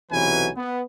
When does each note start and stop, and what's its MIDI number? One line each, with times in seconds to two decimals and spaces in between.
0.11 0.49 35
0.11 0.49 48
0.11 0.49 52
0.11 0.49 54
0.11 0.49 71
0.11 0.49 80
0.57 0.81 59